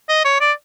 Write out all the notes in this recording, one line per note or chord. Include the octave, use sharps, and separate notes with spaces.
D#5
C#5
D5